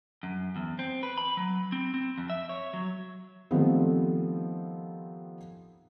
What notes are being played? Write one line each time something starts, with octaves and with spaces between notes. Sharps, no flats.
F#2
E2
C4
B4
B5
F#3
C4
C4
F2
E5
C#5
F#3
D#3 F3 G3 A3 B3 C4